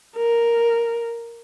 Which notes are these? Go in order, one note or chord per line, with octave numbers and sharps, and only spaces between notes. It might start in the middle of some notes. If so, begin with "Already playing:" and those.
A#4